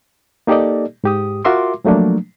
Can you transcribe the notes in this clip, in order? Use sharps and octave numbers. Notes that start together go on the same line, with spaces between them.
A#3 D#4 G4 A4 D5 D#5
G#2 G4 D#6
F4 F#4 A#4 E5 C6 D6
F3 F#3 A3 A#3 D4